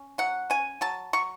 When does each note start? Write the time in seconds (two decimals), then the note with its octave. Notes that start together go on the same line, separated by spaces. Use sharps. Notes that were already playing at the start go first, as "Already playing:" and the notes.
Already playing: C#4
0.18 F#3 F#5
0.50 C#4 G#5
0.81 F#3 A5
1.13 F#3 C#6